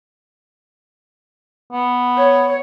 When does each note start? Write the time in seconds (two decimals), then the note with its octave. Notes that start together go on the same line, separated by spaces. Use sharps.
1.72 B3
2.18 C#5